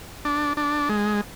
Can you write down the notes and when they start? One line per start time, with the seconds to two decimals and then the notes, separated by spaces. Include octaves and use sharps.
0.25 D4
0.57 D4
0.89 G#3